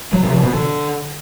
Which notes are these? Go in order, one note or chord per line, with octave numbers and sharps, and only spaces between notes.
F#3
C3
F3
B2
D3